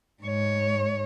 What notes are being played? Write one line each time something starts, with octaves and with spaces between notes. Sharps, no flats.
G#2 C#5